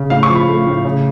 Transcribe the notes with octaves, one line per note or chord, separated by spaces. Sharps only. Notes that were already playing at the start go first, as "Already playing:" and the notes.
Already playing: C#3
A2 F5
C#6
F3
B5
A3
A2
C#3